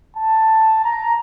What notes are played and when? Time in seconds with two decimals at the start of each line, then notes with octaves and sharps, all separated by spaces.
0.17 A5
0.85 A#5